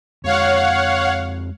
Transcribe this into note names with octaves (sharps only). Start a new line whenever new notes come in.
F2 G#3 C#5 F5 F#5